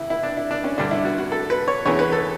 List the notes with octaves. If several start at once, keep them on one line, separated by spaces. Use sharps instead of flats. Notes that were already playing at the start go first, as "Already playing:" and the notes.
Already playing: C#2 E3 E4
E4
D4
E4
D4
C#4
G2 D3 D4
E4
F#4
F#4
A4
B4
C#5
E2 C#3 E3 C#5
B4
A4